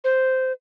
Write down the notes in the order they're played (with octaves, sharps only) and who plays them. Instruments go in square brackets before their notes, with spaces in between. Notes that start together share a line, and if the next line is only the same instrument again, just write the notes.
[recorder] C5